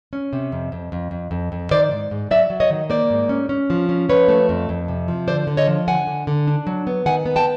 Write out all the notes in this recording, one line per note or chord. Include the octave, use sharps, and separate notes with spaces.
C#4
C3
F2
F2
F2
F2
F2
F2
D#3 C5 D5
G#2
G#2
F#3 D5 E5
F#3
C#5 D#5
D#3
A#3 C5 D5
G#2
C#4
C#4
F3
C#4
F3 B4 C#5
A3
F2
F2
C3
F3
D3 C5 D5
D3
C#5 D#5
F3
D3 F#5 G#5
D3
D3
D4
F#3
B3
D#3 F#5 G#5
B3
G5 A5